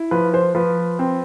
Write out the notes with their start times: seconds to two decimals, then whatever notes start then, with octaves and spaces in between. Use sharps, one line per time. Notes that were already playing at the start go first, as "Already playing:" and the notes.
Already playing: E4
0.11 F3 B4
0.34 C5
0.55 F3 B4
0.99 C4